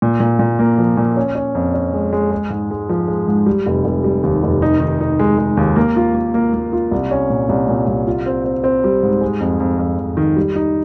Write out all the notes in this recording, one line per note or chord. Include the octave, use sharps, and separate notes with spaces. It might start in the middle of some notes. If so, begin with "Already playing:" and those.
A#2
A#2
A#2
A#3
F3
A#2
C#4
C#4
F2
C#4
G#3
G#3
G#3
G#2
G#3
F3
G#3
G#2
G3
F1
F1
G3
D#2
F1
D#4
D#3
D#4
G#3
G#3
D#2
A#3
F4
A#3
A#3
A#3
F4
C2
C#4
A#2
C2
A#2
C2
F4
C4
C4
C4
G3
G#2
G#3
F2
F2
F2
F2
D#3
G3
D#4